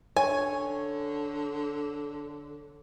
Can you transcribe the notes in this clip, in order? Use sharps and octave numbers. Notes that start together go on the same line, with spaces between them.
D3 C#5 G#5